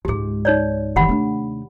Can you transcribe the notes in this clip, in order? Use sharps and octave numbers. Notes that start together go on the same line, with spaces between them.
C#2 G#2 G4 G#4
D#4 C#5 D5
F1 D#3 E3 G4 F#5 B5
D#2 C3 A3 A#3 D4